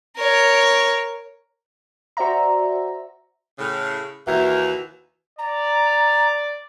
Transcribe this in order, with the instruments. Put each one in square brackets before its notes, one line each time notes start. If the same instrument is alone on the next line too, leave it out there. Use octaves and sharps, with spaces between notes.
[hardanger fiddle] A#4 C#5
[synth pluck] F#4 C5 D5 E5 A#5
[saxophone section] A2 C#3
[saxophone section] D#2 E3 [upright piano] F#4 E5 A#5
[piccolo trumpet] D5 [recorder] A#5